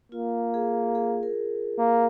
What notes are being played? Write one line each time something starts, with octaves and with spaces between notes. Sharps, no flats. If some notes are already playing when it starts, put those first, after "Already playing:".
A#3 F4
G#4
G#4
A#4
A#3